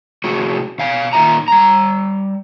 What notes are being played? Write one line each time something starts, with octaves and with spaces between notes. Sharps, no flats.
A2 C3 A3 F#4 G#4
B2 F5 G#5
A#2 D#3 F4 G4 E5 A#5
G3 A#5